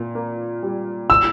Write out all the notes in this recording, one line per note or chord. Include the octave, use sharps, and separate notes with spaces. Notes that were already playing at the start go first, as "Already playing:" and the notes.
Already playing: A#2
A#3
G3
A#2 E6